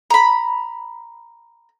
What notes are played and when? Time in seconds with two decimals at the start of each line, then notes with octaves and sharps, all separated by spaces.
0.10 A#5 B5